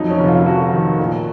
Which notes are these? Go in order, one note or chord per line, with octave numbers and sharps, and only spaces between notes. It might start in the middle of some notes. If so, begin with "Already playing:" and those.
Already playing: F2 F#3 D#4
C#4
F1
F4
F1 F#4
D#3
A#2